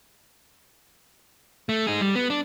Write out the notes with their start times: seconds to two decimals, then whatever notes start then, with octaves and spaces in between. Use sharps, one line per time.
1.69 A3
1.87 D#4 G#4
2.01 G3
2.15 B3
2.30 D4